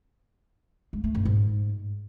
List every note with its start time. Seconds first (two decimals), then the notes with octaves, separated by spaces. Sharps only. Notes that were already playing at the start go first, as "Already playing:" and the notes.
0.93 G#3
1.04 A3
1.15 F#2
1.25 G#2